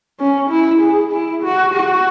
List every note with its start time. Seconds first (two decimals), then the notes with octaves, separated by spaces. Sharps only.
0.20 C#4
0.50 E4
0.82 G#4
1.13 E4
1.44 F#4
1.74 F#4